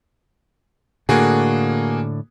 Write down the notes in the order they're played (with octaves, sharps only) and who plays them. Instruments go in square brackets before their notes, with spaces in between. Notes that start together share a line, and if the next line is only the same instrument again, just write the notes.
[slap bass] A2 D3 [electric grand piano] A#3 F#4 G#4